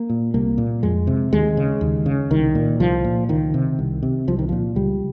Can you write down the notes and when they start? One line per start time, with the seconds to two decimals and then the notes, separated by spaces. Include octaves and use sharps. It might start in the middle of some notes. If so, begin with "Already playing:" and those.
Already playing: A#3
0.10 A#2
0.34 C2 A#3
0.58 A#2
0.83 F2 G#3
1.07 C3
1.33 D#2 G#3
1.57 C#3
1.81 D#2
2.06 C#3
2.31 C2 D#3
2.55 A#2
2.80 C2 F3
3.04 A#2
3.29 C#2 D#3
3.54 C3
3.79 C2
4.03 C3
4.28 C2 F3
4.39 D#3
4.49 A#2 F3
4.76 C#2 G3